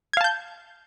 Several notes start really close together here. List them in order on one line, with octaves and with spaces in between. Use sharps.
G#6 F5 A5 G6